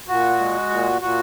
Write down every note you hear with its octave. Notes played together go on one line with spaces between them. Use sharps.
A#2 F#4
G#3
A#2
A#2 F#4